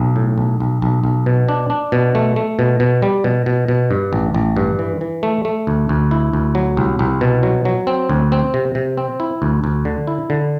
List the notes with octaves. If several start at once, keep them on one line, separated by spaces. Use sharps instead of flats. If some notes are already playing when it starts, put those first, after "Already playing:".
Already playing: B1
A2
B1
B1
B1
B1
B2
D4
D4
B2
A3
A3
B2
B2
G3
B2
B2
B2
G2
A1
A1
G2
E3
E3
A3
A3
D2
D2
E4
D2
F#3
C2
C2
B2
F#3
F#3
C4
D2
C4
C3
C3
C4
E4
D2
D2
D3
E4
D3